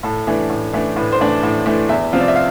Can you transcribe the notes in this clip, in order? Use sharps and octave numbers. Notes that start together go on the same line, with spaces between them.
A2 A4
E3 A3 D4
A2
E3 A3 D4
A2 B4
C5
E3 A3 D4
D5
A2
E3 A3 D4
E2 E5
C3 F3 C4 F4
D5
E5
F5